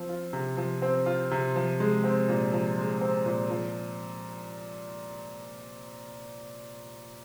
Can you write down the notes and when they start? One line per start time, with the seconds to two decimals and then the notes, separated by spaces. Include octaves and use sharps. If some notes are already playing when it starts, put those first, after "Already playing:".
Already playing: F3 C4
0.09 F4
0.33 C3
0.57 F3
0.82 C4
1.06 F4
1.31 C3
1.56 F3
1.80 G#3
2.04 C4
2.29 A#2
2.53 F3
2.77 G#3
3.01 C4
3.26 A#2
3.50 F3